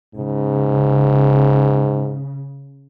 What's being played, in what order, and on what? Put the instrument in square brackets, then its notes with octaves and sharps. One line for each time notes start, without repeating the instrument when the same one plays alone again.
[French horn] G#2 [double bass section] C#3